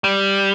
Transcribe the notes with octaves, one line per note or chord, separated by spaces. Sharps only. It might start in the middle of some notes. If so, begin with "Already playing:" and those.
G3